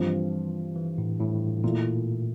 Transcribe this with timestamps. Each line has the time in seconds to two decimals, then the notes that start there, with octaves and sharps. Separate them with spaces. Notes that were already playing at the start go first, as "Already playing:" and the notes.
Already playing: G2 E3 F3 C4 F4
0.76 E3
0.98 A2
1.20 A2
1.63 A#2 E3 A3 E4